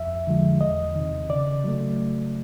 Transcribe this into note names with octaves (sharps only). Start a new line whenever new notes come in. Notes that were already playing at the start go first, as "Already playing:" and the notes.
Already playing: F2 E5
D3 F3 G#3
E2 D#5
C3 D#3
C#3 D5
F#3 A3